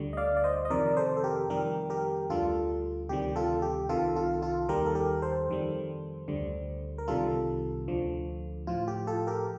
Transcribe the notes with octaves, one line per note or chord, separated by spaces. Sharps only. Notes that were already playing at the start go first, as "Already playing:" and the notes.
Already playing: D2 D3 G3
D#5
D5 F5
D5
C5 D#5
D#5
F2 C3 D#3 A#4 D5
D5
A4 C5
A4
G4 A#4
F2 D#3 G3 G4 A#4
G4 A#4
D2 D3 G3 F4 A4
D2 C3 D#3 G3 G4
F4 A4
G4
C2 C3 D#3 F4 A4
F4 A4
F4 A4
D#2 D#3 G3 G4 A#4
A4
G4 A#4
A4 C5
F2 D#3 G3
D2 D3 G3
A#4
C2 C3 D#3 G3 F4 A4
D2 D3 F3
A2 F3 F4
G4
F4 A4
G4 A#4